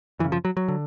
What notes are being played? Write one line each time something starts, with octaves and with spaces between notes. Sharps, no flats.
F#2 C#3 E3
F3
F#3
F#3
D3